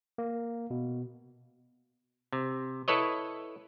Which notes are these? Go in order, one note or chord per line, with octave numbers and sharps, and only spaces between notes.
A#3
B2
C3
E4 A4 B4 C#5 D#5